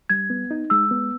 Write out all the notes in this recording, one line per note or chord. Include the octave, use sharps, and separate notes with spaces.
G3 G#6
B3
D#4
G#3 E6
B3